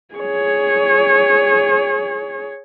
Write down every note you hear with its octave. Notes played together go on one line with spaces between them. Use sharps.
G#4 C#5